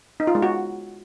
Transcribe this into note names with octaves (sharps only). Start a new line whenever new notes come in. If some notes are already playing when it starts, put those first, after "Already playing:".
D#4
F4
G#3
F#4